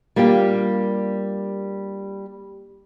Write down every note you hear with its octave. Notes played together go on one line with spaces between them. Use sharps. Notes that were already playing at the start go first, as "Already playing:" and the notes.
G3 A#3 D4 F4 G4